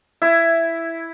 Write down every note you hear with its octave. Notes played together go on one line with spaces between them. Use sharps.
E4